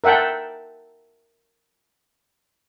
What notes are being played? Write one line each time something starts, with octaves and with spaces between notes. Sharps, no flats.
A#4 E5 F#5 G5 A5